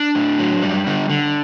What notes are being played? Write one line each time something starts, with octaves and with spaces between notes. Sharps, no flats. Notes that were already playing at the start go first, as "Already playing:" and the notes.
Already playing: D4
A2
F#3
G3
D3
D3